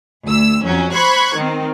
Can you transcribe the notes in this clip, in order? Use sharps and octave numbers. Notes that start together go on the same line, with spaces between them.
D2 E6
F2 F#3 C#4
C5 B5 C#6 F#6 G#6
D#3 C4